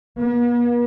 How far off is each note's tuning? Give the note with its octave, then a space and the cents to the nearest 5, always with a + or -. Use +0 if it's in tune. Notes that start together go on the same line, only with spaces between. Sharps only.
B3 -45